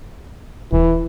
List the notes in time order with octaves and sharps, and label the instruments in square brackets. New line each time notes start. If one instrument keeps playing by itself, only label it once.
[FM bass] D#1 [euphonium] E3